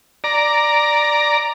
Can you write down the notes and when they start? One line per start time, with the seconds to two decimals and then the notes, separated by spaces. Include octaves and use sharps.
0.24 D5 A#5